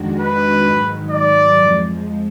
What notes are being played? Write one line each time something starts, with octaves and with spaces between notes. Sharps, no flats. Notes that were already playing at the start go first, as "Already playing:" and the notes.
Already playing: F2 D#3 G#3 D4 F#4
B4
G#2 D#3 F#3
D5
F2 F3 G#3